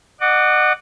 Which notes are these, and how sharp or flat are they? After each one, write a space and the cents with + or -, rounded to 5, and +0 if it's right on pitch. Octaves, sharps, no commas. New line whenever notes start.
D#5 -45 F#5 +0 D6 -15